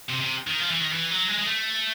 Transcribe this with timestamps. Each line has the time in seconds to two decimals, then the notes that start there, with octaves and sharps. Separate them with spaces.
0.09 C3
0.21 C3
0.47 D#3
0.60 F3
0.71 E3
0.81 D#3
0.92 E3
1.11 F#3
1.29 G#3
1.39 G#3
1.46 A3